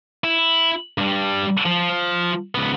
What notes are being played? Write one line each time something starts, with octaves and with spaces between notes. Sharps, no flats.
E4
G2 G3
F3
C#2 B3